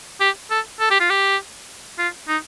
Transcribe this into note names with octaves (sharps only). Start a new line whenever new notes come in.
G4
A4
A4
G4
F4
G4
F4
D#4